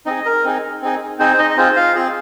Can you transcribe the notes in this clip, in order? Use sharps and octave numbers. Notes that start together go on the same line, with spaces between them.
C4 D#4 G#4 D#5
A#4
C4 D#4 G#4
C4 D#4 G#4
C4 D#4 G#4 C5
D#4 D#5
D#5
C4 F4 G#4 C5
F4 F5
C4 F4 G#4